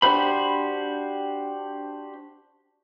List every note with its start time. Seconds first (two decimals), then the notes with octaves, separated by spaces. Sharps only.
0.02 D4 F#4 G4 C5 B5